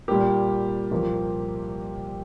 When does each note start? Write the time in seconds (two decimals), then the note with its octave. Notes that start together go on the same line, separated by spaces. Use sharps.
0.08 A#2 G3 A#3 G4
0.91 C2 A#2 F3 A#3